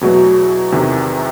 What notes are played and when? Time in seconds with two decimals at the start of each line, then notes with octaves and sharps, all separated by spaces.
0.01 E2 B2 F#3 A3
0.72 E2 C3 D#3